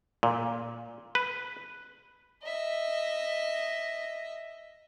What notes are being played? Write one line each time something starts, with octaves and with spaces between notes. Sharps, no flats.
A#2
B4
D#5 E5